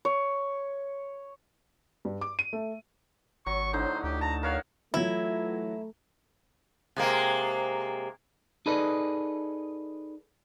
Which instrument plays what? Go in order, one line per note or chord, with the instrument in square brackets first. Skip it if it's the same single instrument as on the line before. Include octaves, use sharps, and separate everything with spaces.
[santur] C#5
[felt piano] G2
D6
D#7
A3
[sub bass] G#1 [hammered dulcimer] F#3 [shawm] C#6
[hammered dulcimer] A2 D3 D#4 [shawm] C5
[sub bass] D2 [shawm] G4
[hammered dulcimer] A5 [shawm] A#5
[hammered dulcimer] A#4 C#5 F#5 [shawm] F5
[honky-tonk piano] E3 F#3 [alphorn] A3 [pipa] E4 [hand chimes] F4 G#6
[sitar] C3 G#3 A#3
[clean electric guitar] D#4 G#4 A4 B4 D5 D#5